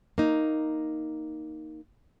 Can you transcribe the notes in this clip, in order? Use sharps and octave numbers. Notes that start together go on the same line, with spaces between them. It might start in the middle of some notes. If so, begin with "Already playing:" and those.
A#3 D#4